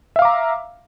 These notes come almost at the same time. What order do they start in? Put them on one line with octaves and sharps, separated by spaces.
E5 F5 D6 A#5